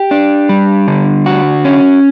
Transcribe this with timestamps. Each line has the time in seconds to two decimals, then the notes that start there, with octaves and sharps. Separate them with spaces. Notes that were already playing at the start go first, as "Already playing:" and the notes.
Already playing: G4
0.11 D4
0.49 G3
0.88 D3
1.26 F#4
1.65 C#4